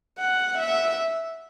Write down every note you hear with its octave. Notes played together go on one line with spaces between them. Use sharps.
F#5
E5